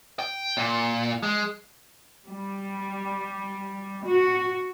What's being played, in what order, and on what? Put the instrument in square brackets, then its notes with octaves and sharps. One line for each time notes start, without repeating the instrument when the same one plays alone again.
[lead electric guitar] G5
A#2
G#3
[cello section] G3
F#4